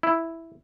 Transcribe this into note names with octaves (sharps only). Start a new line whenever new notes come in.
E4